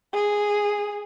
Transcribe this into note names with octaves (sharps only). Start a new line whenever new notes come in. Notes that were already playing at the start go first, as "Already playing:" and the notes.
G#4